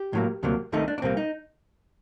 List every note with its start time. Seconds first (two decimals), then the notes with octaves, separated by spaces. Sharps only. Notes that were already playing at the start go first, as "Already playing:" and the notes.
Already playing: G4
0.13 A2 F#3 A#3
0.43 D2 C3 F#3 A#3
0.72 C2 C3 D#3 A3 D#4
0.88 D4
0.98 D4
1.02 C2 A#2 G3 A#3 C4
1.17 D#4